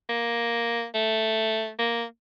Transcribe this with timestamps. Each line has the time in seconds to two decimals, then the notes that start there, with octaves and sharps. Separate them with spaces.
0.09 A#3
0.94 A3
1.79 A#3